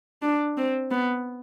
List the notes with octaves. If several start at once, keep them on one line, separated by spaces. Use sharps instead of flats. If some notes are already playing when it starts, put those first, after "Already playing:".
D4
C4
B3